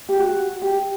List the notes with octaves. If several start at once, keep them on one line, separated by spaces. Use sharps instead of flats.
G4
F#4
G4